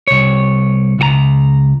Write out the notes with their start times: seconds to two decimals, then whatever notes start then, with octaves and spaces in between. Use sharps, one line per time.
0.07 C2 C#5
0.99 C#2 F#4 A#5